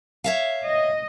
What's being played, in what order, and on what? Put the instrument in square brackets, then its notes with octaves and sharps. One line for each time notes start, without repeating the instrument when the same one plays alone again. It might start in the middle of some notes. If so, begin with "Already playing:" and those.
[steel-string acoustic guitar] C#5 E5 F5
[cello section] D#5